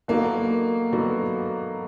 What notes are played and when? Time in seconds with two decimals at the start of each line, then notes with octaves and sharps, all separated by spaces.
0.08 D3 F#3 A#3 B3 D#4 F#4
0.92 D3 F#3 B3 D#4 F#4